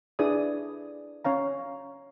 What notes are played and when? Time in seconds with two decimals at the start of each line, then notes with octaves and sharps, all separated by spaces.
0.19 D4 E4 G#4 B4 D5 D#6
1.25 C#4 C#5 F5 A#5